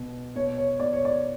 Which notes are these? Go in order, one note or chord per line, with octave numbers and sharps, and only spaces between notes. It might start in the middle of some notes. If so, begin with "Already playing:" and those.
Already playing: B2
B2 C#5
C#5
B2 D5
C#5
D5